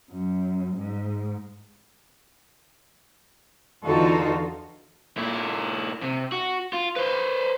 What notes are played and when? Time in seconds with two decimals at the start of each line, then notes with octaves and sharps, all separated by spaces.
0.12 F#2
0.77 G#2
3.85 E2 D3 D#4 F4 F#4 A4
5.17 A#2 E4
6.02 C3
6.32 F#4
6.73 F4
6.96 B4 C5